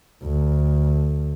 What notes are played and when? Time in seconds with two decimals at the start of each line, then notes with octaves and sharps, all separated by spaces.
0.23 D2